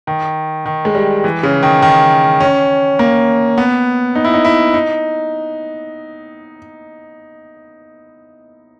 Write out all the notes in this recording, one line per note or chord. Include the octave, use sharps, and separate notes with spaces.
D#3
D#3
G#3
G3
E3
C#3
D#3
D#3
C#4
A#3
B3
D#4
E4
D#4
E4
D#4